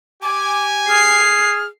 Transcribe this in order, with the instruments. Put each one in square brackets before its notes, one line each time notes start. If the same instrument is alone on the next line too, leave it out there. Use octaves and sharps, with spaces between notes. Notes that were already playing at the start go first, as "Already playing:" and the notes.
[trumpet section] G4 G#5 [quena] D6
[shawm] G#4 [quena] F6 [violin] C7